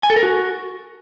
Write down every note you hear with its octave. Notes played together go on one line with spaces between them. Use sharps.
G#5
A4
A#4
F#4